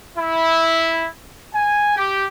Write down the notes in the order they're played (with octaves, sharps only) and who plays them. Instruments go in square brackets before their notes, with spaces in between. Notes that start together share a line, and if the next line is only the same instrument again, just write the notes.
[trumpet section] E4
G#5
G4